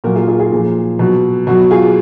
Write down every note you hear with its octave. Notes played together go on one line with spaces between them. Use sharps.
A#2 F#3 F#4 A#4
F4 G#4
F4 G#4
F4 G#4
A#2 F3
B2 F#3
B2 F#3 F#4
F4 G#4